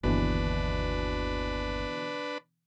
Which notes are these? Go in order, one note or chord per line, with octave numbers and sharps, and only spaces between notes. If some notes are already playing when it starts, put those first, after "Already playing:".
G1 D#2 B2 D3 E3 D4 B4